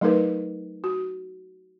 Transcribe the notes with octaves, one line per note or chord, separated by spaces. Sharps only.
F#3 A3 D#4 G#4 A#4 B4
F#4